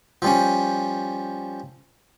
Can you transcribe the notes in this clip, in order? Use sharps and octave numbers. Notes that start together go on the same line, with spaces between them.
F3 G3 C#4